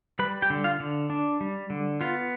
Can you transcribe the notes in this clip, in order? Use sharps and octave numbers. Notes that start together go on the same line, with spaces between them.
G3 B4 B5
G4 G5
D3
F4 F5
D3
D4
G3
D3
B3 F4 F5